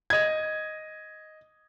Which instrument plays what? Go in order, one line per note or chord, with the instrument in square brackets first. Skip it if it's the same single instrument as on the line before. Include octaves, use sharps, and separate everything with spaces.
[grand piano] D#5 G#6